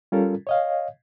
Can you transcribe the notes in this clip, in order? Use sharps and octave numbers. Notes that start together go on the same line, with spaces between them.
G3 C#4 F4 A4 A#4
C#5 D#5 F5